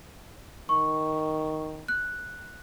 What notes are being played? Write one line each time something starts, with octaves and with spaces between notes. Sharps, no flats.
D#3 C#6
F#6